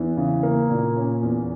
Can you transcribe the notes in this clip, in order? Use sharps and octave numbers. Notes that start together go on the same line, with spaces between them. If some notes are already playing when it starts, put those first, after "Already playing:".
Already playing: E2 E3
C#3
A#3
A#2
C#4
E2